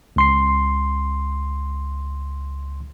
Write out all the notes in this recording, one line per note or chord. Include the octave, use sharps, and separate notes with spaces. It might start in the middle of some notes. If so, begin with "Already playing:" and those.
C#2 C6 C7